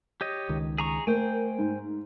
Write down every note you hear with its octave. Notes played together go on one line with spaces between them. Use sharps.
G4 C#5 D#5
C#2 D#3
G#4 A#5 C#6
A3 A#3 C5 G5 G#5
G#2